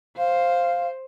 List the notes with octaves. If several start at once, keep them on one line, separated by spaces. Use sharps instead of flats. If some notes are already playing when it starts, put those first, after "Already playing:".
C5 F5